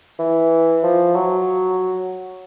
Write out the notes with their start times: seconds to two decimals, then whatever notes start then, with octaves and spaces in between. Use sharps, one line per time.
0.19 E3
0.83 F3
1.15 F#3